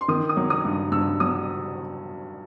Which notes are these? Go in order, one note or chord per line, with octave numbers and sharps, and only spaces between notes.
C6
D#3 D#6
D#6
F#3
D#6
G2
G2 E6
F#3 D#6